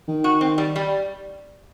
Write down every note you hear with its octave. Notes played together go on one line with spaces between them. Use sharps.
D#3
F#4
C4
G3
G3